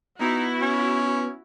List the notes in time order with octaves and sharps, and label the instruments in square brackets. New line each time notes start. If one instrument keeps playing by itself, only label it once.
[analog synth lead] B3 [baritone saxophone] D#4 [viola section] E4 F#4
[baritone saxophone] C#4